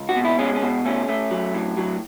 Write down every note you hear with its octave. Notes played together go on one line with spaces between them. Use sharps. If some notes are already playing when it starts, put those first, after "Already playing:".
Already playing: C#2
F#4
B2
E4
G#3 C#4
C#4
B2
A3 C#4
A3
F#3
A2
F#3